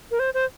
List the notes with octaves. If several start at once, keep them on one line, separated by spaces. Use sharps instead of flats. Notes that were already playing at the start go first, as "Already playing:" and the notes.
A#4
C5
C5